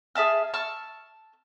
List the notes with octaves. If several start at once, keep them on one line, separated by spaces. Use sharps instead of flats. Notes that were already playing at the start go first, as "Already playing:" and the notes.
G#4 E5 A5 F6
A5 C#6 E6 F6